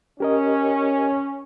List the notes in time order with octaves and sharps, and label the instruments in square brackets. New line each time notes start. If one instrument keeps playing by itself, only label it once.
[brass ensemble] C#4 [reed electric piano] G4 A#4 D#5